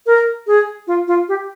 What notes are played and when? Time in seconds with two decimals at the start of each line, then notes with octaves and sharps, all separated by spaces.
0.06 A#4
0.47 G#4
0.87 F4
1.07 F4
1.28 G4